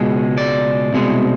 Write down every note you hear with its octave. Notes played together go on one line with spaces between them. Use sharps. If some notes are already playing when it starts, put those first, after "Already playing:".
Already playing: C#2 B2 G#3
D5
C2 B2 G#3